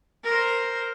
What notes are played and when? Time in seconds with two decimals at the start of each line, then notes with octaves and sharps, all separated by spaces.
0.23 A#4 C5